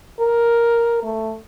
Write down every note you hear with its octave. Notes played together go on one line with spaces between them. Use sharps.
A#4
A3